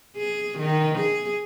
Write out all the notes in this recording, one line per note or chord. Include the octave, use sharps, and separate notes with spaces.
G#4
D#3
G#4